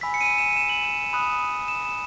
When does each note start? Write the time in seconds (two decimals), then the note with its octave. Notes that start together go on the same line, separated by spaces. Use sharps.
0.01 G#5 B5 E6 B6
0.14 C#7
0.21 D#7
0.38 E7
0.57 E7
0.69 F#7
0.83 E7
1.13 B5 D#6 F#6
1.68 E7
1.81 E7